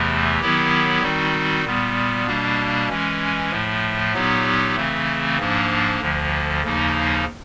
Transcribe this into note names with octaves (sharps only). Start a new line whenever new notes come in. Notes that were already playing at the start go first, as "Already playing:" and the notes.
Already playing: E2 C3 E3 A3
D#3 F#3 B3 E4 G4
D#3 G3 C4 D#4 F#4
A#2 G3 B3
B2 G3 A#3 D4
E3 G#3 C#4
A2 F3 A3
A#2 F#3 B3 D#4 G4
C#3 E3 A3 C4
G#2 F3 A#3 D4
D2 D3 F3
D#2 C#3 F3 A#3 D#4